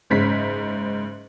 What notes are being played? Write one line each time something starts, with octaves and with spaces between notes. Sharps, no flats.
F#1 G#2 C#4 B6